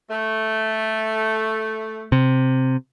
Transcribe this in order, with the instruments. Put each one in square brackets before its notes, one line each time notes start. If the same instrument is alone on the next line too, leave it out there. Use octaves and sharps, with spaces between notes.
[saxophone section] A3
[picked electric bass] C3